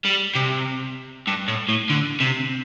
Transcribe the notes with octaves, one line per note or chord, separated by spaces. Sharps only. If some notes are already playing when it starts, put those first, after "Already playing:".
G3
C3
G2
A2
A2
D3
C3